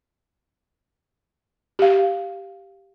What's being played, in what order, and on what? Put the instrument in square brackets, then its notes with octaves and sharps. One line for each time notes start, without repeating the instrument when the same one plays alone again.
[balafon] G4 F5